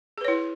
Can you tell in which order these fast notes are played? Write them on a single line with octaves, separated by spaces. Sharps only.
G#4 B4 C#5 E4